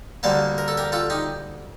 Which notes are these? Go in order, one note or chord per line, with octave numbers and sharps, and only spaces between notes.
D2 D3 G3 A#3 F5 A5
A#4
A4
G4 A#4
F4 A4
D#4 G4